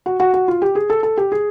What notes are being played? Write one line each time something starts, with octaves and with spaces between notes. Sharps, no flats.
F#4
F#4
F#4
F4
G4
G#4
A4
A4
G4
G#4